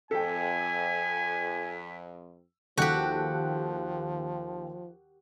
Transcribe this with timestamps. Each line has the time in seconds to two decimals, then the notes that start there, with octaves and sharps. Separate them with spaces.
0.11 F2 A4 G5 G#5 B6
2.78 D#2 F3 F#4 G4 A4 F#6